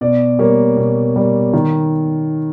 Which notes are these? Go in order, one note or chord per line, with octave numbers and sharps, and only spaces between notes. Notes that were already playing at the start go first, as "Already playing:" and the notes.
B2 D5
G3 A#3 C#5
B2
G3 A#3
D#3